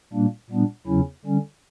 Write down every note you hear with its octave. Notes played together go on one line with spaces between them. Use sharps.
A#2 G3 A#3 D4
A#2 G3 B3 D4
E2 C#3 F#3 C#4 E4
D3 G3 C#4